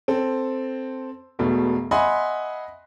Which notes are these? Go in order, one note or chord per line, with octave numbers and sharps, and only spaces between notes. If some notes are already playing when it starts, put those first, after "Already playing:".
C4 A4
E1 B2 A3
D#5 E5 F#5 G#5 B5 C6